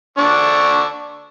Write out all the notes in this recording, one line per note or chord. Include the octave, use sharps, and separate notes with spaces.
D3 D4 C#6